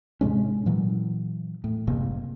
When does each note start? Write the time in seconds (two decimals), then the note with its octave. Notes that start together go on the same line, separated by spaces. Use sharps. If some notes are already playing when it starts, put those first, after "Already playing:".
0.21 G#2 C3 G#3 C#4
0.66 A#2 E3 F#3
1.64 A2
1.87 F#1 C3 A#3